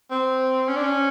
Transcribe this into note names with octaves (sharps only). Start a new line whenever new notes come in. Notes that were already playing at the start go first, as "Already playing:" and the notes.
C4
C#4
D4
C#4